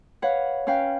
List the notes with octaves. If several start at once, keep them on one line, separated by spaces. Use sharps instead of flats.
B4 C#5 F5 F#5
C#4 B4 F5 G5